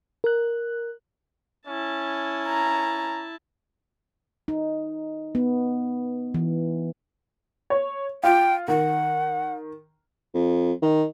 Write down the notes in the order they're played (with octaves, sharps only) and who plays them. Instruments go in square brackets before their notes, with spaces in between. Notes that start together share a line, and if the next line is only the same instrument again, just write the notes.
[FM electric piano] A#4 F#6
[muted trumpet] C#4 [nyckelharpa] E4 A5
[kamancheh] A#5
[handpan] D#4
B3
E3
[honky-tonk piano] C#5
[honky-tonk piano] F4 [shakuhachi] G5
[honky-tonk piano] D#3 [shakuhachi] F#5
[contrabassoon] F2
D#3